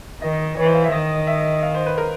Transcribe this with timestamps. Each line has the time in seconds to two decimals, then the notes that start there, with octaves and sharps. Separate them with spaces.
0.21 D#3 D#5
0.57 E3 C#5
0.65 C5
0.74 F5
0.84 E5
0.92 D#3 D#5
1.27 E5
1.63 F5
1.75 C5
1.86 B4
1.98 A#4